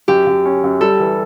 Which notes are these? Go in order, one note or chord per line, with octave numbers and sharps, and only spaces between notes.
F#2 G4
F#2
C#4
F#2
G3 A4
E3